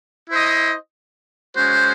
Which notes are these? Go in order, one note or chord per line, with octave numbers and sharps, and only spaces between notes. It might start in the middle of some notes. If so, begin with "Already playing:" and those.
E4 C5 D#5
G#3 C#4 F#4 C5